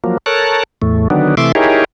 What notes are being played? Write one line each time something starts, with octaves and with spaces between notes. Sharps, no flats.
F3 F#3 A#3
A4 A#4 C#5 A5 F#6
E2 A2 A3
D3 D#3 F#3 B3 D4
C3 E3 A3 E5 C6 D6
D#4 E4 G4 G#4 A#4 C#5